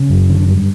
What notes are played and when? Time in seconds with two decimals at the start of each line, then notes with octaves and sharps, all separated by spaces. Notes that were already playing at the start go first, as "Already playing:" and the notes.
Already playing: C#3
0.10 F#2
0.30 D3
0.49 G2